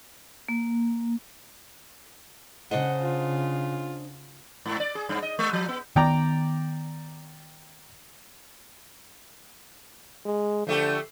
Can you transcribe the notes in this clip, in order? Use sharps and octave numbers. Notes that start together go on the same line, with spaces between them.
A#3
C#3 D4 C5 D#5 F#5
F4
G#2
D5
G#4
G2
D#5
G#3
F3
B3
D#3 B3 D5 G5 A#5
G#3
D3 F3 A3 G4